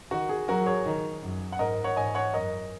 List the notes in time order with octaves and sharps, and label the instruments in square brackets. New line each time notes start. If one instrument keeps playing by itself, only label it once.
[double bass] D#3 [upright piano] F#4
[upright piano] G#4
[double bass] F#3 [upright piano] F#4 A#4
[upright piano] G#4 C#5
[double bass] D#3
F#2
[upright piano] F#5
[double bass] G#2 [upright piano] A#4 D#5
[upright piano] C#5 F#5
[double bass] G#2 [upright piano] D#5 G#5
[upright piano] C#5 F#5
[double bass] F#2 [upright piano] A#4 D#5